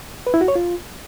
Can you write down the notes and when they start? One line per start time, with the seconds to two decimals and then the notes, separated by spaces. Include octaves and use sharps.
0.27 B4
0.34 E4
0.41 F#4
0.48 C#5
0.55 F4